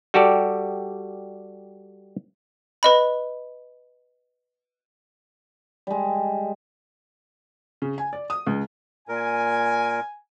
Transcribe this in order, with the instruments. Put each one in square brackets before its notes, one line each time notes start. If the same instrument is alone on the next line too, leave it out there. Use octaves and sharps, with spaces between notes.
[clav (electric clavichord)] G3 F#4 G4 A4 D5
[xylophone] B4 D#5 B5
[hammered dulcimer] G3 G#3
[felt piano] C#3
G#5
D5
D#6
C#2
[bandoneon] A#2 A#4 [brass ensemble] G#5